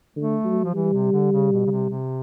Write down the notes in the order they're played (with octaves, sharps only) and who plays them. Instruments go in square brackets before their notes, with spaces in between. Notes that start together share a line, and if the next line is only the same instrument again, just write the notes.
[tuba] D3 [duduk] A3
[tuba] F#3
[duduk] F3
[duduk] E3 [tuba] G3
[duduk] C3
D3
C#3
B2
C#3
C3
C3